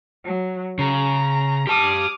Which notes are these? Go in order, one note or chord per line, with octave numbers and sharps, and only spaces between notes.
F#3
C#3 A#5
G4 A5 D6 D#6 F6